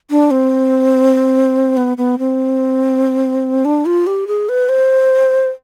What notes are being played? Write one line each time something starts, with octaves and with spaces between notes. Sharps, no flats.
D4
C4
B3
B3
C4
D4
F4
G4
G#4
B4
C5